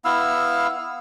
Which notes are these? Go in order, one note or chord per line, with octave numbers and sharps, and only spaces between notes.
B3 E4 F5 E6